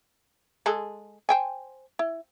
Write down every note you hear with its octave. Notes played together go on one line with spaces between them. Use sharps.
G#3 G#4 A4
C5 G5 G#5
E4